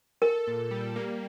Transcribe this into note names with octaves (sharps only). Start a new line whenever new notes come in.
A4 A#4
A#2
G3
A#3